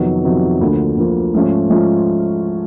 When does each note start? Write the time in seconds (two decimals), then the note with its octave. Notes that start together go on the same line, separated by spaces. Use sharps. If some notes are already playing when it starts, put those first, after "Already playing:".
Already playing: F2 C3 D#3 F#3 B3
0.24 F2 C3 D#3 F#3 B3
0.61 D2 D3 F3 A#3
0.97 D2 D3 F3 A#3
1.34 G#2 F3 A3 C#4 F4
1.70 G#2 F3 A3 C#4 F4